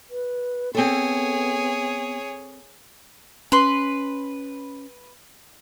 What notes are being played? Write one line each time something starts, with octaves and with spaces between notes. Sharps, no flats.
B4
B3 C4 G#4 A4 C#5
C#4 B4 C6